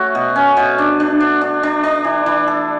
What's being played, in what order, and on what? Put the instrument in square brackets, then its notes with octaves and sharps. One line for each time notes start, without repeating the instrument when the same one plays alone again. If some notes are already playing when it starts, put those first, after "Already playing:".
Already playing: [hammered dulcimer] A3 C#4 F#4
B2
C#4
B2
D4
D4
D4
D4
D4
D4
E3
E3
A4